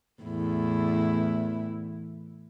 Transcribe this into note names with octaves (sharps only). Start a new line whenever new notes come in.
E2 A2 E4